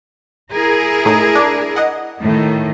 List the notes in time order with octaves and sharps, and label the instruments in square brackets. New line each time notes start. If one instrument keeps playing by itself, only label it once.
[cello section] E4 G#4 A#4
[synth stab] A2 D#4
D4
D#5 F#5
[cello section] A2 D#3 A3